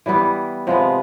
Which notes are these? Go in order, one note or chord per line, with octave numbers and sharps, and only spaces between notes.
E3 G3 B3 E4
C3 F3 G#3 B3